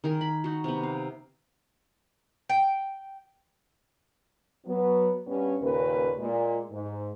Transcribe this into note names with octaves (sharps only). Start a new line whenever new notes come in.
D#3 G#4 A#4
B5
D#4 F#4
C3 B3
F5
G5
F#3 B3
G2 B3 C#4
D#2 A#2 C#3 C#4 A#4 B4
A#2 G#3
G#2